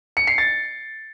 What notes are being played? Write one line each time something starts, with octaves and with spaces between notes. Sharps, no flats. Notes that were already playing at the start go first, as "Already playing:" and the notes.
C#7
C7
A6